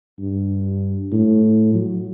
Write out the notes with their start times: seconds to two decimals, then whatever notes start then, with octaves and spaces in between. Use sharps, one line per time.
0.19 G2
1.12 A2
1.74 F#3